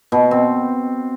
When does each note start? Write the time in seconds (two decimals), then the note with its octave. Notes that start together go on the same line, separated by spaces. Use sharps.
0.12 B2
0.31 C4